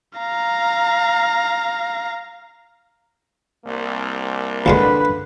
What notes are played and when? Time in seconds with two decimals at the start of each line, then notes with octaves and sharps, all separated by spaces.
0.19 F5 A#5
3.65 C2 A#3
4.66 D2 A#2 D3 G#3 B4